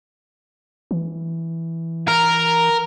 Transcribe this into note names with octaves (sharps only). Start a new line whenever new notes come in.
E3
A#4